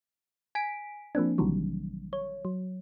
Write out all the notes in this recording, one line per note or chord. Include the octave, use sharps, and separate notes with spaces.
G#5 B6 D7
F3 A#3 C4 D4
A#1 C3 D#3 E3 F#3 G3
C#5
F#3